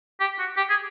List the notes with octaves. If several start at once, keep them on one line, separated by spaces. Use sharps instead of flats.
G4
F#4
G4
G#4